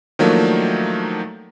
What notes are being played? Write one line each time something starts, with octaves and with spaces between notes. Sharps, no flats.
D#3 F3 F#3 A3 A#3 D4